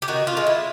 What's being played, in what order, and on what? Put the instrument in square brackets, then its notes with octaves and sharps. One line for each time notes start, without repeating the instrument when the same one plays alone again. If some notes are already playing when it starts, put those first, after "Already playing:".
[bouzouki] G4
D#3 F#4
F4
G#3
E4